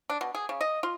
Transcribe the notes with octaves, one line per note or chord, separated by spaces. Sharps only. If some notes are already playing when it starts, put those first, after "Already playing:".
D4
B2
G#4
C#3
D#5
F4